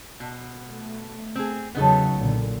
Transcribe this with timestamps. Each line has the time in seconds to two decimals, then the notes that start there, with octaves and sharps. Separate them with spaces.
0.20 B2
0.66 A3
1.35 C4 G#4
1.75 E2 C#3 F#3 B3 D#4 A4
2.14 B1 A#2 D3